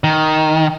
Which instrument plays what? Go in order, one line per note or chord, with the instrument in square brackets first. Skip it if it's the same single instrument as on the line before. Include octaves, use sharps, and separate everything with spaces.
[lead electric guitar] D#3